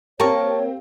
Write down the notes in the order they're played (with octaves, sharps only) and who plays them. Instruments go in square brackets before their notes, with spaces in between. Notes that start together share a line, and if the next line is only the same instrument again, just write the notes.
[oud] A#3 [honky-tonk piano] C4 G4 [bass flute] C#5 [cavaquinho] A5 C#6